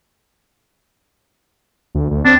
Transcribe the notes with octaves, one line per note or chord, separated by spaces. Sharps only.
D2
D2
C4 D4